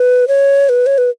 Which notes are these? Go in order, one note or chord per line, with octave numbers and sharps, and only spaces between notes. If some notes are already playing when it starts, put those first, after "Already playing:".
Already playing: B4
C#5
B4
C#5
B4